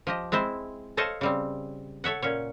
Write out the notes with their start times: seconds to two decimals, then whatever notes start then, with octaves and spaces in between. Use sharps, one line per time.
0.07 F3 G4 D#5
0.32 G#3 C4 E4 C5
0.97 A4 C5 C#5 D#5 F5 A5
1.21 C#3 G3 C4
2.04 A4 C#5 E5 F#5
2.22 A#2 C#4 C#5